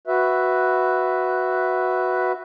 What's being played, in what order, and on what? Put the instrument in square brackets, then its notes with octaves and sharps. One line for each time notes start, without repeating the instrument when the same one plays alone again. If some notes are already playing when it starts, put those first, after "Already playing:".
[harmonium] F#4 B4 E5